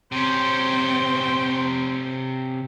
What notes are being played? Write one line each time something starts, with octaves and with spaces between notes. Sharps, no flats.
C3 C4 C#4 G5 C6